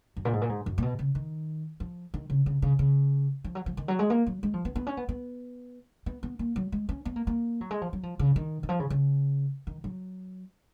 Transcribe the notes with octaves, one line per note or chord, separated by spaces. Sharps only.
F#2
A#2
G#2
A#2
G#2
F#2
A#2
B2
C#3
D#3
F3
D#3
C#3
C#3
C#3
C#3
F3
F#3
F3
D#3
F#3
G#3
A#3
F#3
G#3
F3
B3
B3
C#4
B3
B3
B3
B3
A#3
F#3
G#3
C#4
B3
A#3
A#3
F#3
G#3
F3
F#3
F3
C#3
D#3
D#3
F3
C#3
C#3
D#3
F#3